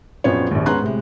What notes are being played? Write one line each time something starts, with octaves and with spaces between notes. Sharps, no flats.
A#1 F#2 B3 C4 F4 C#5
A#1 D#2
G#2 B3 C#4 A#5 C6 F#6
A2 C3 G#3